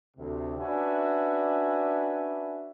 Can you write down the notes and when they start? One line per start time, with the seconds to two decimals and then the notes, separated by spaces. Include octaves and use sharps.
0.17 D2 C3
0.58 C#4 D4 F#4 B4 E5 G#5